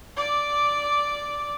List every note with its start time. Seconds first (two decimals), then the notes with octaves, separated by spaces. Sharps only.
0.17 D5 D6